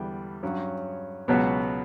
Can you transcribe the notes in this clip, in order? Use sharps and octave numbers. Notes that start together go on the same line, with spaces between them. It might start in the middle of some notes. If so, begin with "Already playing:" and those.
Already playing: E2 D3 G3 B3
G2 F#3 C#4
C#2 B2 F#3 B3